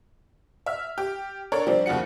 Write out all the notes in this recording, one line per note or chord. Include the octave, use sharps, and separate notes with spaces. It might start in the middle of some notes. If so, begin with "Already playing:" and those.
E5 F6
G4
D4 A4 A#4 C#5
F3 G3 C4 D4
D#2 C#3 F3 F#4 C#7